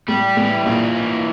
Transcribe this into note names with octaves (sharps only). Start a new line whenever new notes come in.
A2 G3
A2 E3
A#1 A#2 A#3
E3